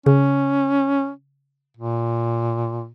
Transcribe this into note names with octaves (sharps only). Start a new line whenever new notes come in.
C#3 C#4
A#2